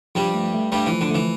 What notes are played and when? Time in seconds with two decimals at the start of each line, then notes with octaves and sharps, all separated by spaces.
0.15 G2 F3 G3
0.35 A3
0.54 A3
0.72 G2 G3 A3
0.86 E3 F3
1.01 D3
1.11 E3 A3